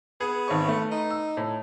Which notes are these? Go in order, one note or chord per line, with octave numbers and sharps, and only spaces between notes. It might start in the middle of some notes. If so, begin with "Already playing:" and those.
B3 G#4
G#1 C#5 C#6
A3
D#4
E6
A2